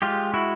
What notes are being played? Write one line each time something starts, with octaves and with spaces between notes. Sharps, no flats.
G#3 F4 G4
E4 F#4